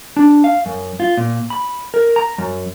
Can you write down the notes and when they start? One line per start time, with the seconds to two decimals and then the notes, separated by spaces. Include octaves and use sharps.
0.17 D4
0.44 F5
0.66 F#2
1.00 F4
1.17 A#2
1.50 B5
1.94 A#4
2.16 A#5
2.38 F#2